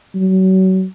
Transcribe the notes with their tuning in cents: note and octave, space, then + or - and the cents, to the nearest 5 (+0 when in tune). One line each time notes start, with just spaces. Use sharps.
F#3 +30